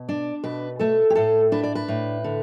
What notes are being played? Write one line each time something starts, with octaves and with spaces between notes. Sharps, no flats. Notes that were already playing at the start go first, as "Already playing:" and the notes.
Already playing: B2
D4 D5
B2 B4
A3 A4
G4
A2 A4
D4 B4
D5
B4
A2
D3